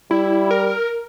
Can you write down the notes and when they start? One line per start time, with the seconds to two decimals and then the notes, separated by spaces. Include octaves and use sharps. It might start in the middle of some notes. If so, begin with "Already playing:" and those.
0.11 G3 E4
0.51 A#4